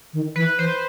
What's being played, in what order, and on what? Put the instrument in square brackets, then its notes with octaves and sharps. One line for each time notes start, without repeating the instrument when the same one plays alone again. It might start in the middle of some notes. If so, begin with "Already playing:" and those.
[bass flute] D#3
[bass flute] E3 [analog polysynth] B4
[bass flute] E3 [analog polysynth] C5